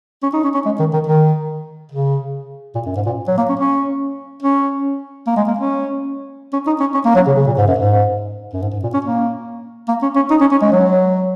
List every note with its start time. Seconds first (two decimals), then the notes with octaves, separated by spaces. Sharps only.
0.23 C#4
0.33 D#4
0.44 C#4
0.54 C#4
0.65 G#3
0.79 D#3
0.93 D#3
1.07 D#3
1.92 C#3
2.75 A#2
2.86 F#2
2.96 G#2
3.06 A#2
3.28 F#3
3.37 A#3
3.49 C#4
3.59 C#4
4.42 C#4
5.27 A#3
5.37 G#3
5.48 A#3
5.59 C#4
6.53 C#4
6.67 D#4
6.80 C#4
6.94 C#4
7.05 A#3
7.15 F#3
7.27 C#3
7.37 C#3
7.47 A#2
7.58 G#2
7.67 F#2
7.78 G#2
8.53 F#2
8.62 G#2
8.73 G#2
8.83 A#2
8.94 C#4
9.04 A#3
9.88 A#3
10.02 C#4
10.16 C#4
10.30 D#4
10.41 C#4
10.51 C#4
10.62 G#3
10.72 F#3